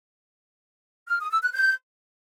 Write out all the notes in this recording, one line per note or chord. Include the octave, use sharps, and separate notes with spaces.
F6
D#6
E6
F#6
G6